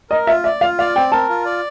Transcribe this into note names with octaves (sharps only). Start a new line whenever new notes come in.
A#4 D#5
F4 E5
D5 E5
F4 F5
D5 F5
C4 G5
A#4 A5
F4
D5